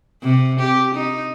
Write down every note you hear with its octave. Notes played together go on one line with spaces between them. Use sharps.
C3
G4
D#4